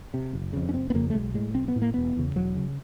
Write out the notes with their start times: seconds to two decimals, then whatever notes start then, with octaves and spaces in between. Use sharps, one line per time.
0.14 C3
0.33 F#1
0.53 F2 C#3
0.69 C#4
0.74 F#1 C4
0.90 B3
0.94 F2 C#3 A#3
1.10 A3
1.14 B1 G#3
1.34 A2 G#3
1.55 B1 C4
1.68 B3
1.76 A2
1.82 A#3
1.94 E1 B3
2.16 E2 C#3
2.36 E1 F#3
2.56 C#3